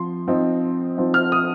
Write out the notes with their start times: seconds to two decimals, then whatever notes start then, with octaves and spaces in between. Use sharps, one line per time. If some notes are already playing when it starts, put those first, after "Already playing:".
Already playing: F3 C4 C6
0.28 F3 C4 D#4
0.96 F3 C4 D#4
1.14 F6
1.32 D#6